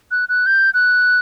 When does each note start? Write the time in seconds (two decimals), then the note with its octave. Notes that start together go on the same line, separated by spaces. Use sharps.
0.11 F#6
0.29 F#6
0.46 G6
0.74 F#6